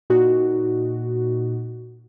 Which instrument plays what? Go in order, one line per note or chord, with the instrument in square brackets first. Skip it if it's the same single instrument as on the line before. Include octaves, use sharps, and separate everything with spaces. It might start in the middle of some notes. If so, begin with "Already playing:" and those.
[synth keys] A#2 D#4 F#4